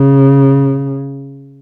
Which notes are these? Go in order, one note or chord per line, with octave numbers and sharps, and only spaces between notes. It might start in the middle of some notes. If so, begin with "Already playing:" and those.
Already playing: C#3